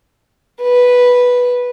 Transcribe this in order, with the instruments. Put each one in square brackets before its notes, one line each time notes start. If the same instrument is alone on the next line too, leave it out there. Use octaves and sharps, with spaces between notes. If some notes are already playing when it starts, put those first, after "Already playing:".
[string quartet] B4